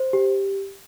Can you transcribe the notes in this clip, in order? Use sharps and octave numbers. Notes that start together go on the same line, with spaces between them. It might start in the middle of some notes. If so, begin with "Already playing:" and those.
Already playing: C5
G4